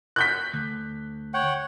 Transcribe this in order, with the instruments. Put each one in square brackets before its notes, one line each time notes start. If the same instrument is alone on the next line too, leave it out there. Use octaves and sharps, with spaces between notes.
[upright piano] F#6 G6 B6
[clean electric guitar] D2
[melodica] C#5 F#5 G5